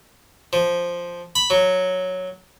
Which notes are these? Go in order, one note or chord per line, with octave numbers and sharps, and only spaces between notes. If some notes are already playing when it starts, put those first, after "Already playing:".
F3
B5
F#3